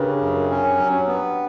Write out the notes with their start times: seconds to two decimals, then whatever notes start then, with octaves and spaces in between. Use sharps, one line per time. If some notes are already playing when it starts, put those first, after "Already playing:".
Already playing: C#3 D4 G4 A#4 B4
0.21 F#2
0.50 C#4
0.80 F#3
1.07 B3